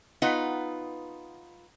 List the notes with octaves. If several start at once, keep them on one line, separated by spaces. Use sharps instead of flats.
B3 D#4 F4 B4 F#5